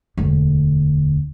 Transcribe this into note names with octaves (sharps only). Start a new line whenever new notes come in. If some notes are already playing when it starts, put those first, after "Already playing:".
E1 D2